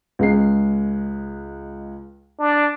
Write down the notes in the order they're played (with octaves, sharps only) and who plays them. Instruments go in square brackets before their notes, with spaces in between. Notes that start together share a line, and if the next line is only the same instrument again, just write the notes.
[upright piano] C#2 G#3 C7
[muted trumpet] D4